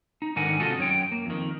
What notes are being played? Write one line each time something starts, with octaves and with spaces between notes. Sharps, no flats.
D#4
G#2 D3 D#3 A#4 F#5 G#5
C3 F4 F#4 A4 D#5
F#2 C#5 G5
A#3
F2 D#3